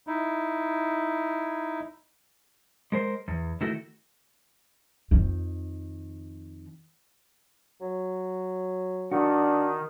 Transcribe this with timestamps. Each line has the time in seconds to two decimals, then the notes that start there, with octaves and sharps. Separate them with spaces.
0.07 D#4 E4
2.92 G#3 A#4 C5
3.28 E2
3.61 D#3 A3 E4 F#4 A4
5.11 F2 D#3
7.81 F#3
9.12 D#3 D4 F#4